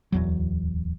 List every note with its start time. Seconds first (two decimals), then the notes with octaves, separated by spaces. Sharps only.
0.12 D1 E2 F#3